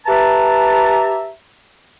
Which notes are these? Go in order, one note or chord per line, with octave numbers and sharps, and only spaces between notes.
G4 B4 E5 A5 A#5